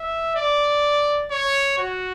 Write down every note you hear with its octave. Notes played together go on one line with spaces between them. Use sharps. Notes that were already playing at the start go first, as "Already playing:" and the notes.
Already playing: E5
D5
C#5
F#4